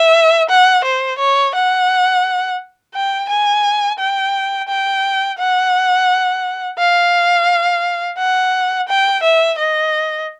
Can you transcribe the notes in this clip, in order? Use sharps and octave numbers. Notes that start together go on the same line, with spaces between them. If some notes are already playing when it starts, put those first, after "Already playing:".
Already playing: E5
F#5
C5
C#5
F#5
G5
G#5
G5
G5
F#5
F5
F#5
G5
E5
D#5